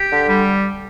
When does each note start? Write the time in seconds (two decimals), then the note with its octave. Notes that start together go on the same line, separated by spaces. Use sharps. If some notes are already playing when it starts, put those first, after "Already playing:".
Already playing: G4
0.12 D3
0.29 G3